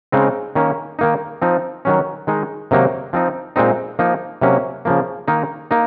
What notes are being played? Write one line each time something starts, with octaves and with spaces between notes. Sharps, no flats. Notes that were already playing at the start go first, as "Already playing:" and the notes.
C#3 G#3 C4 D#4
D#3 A#3 C#4
D#3 A#3 D#4
F3 C4 D#4
D#3 F#3 C#4
D#3 G#3 D#4
C3 D#3 F#3 A#3 D#4
F3 C4 D#4
A#2 G#3 C4 D#4
F3 A#3 D#4
C3 F#3 A#3 C#4
C#3 F3 A#3
D#3 A#3 D#4
A#3 D#4